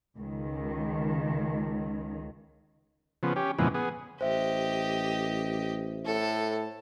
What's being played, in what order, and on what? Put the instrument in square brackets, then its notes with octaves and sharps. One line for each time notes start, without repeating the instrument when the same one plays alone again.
[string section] C#2 D#3
[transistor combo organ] C#3 F3 B3
C#4 G4
F2 A#2 C#3 E3 G#3 B3
B3 G#4
[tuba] A1 [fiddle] G4 D#5 [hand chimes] C5 E5
[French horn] A2 [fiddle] A4